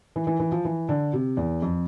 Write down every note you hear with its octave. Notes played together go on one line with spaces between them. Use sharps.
E3
E3
E3
F3
E3
D3
C3
E2
F2